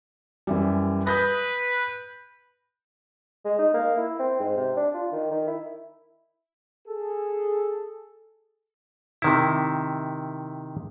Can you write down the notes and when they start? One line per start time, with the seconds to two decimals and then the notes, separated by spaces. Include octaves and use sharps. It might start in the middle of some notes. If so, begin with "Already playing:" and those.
0.47 F#2 E3 G3
1.07 B4 D#6 G6 A#6
3.45 G#3
3.59 D#4
3.74 A#3
3.98 E4
4.19 C4
4.40 G#2
4.57 C3
4.77 D4
4.94 F4
5.12 D#3
5.31 D#3
5.47 E4
6.88 G#4 A4
9.22 C3 D#3 E4